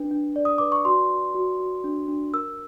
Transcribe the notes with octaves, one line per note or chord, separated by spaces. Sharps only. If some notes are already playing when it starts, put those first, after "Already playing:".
Already playing: D4 B4
D4
D5
D#6
B4 D6
C#6
F#4 C6
F#4
F#4
F#4
D4
D4
A#4 E6